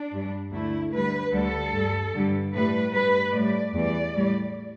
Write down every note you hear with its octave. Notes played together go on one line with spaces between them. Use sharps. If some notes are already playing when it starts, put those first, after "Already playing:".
Already playing: D4
G2 G3
D2 D3 A3 E4
D2 D3 G3 B4
D2 D3 G3 A4
G2 G3
G2 D3 G3
A2 G3 B4
G2 G3 B4
A2 G3 D5
E2 E3 G3 D5
A2 G3